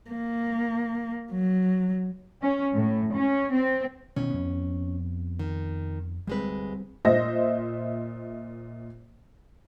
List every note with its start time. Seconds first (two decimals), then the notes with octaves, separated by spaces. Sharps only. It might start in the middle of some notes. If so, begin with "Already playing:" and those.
0.11 A#3
1.33 F#3
2.42 C#4
2.75 A2
3.15 C#4
3.53 C4
4.16 B2 D#3 E3 C#4
4.30 F2 B3
5.39 D#3
6.27 D2 G3 G#3 C4 B4
7.05 A#2 C5 D#5 E5 A#6